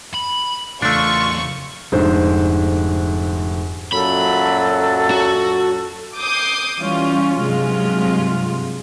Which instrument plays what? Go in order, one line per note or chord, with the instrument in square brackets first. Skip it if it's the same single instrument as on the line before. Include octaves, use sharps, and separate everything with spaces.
[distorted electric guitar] B5
[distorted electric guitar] E2 C#3 [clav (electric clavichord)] A3 D4 [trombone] F4 [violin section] C#6
[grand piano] F1 G#2 D3 C5
[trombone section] F#2 A#2 F#3 [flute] A4 [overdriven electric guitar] B5
[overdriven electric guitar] F#4
[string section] D6 D#6 G6 C7
E3 G3 C#4 F4
G2 C3 F#3 G#3 F4